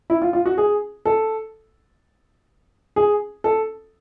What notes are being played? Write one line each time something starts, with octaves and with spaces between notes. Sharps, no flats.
E4
F4
F4
F#4
G#4
A4
G#4
A4